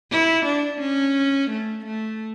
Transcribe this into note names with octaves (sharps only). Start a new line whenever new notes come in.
E4
D4
C#4
A3
A3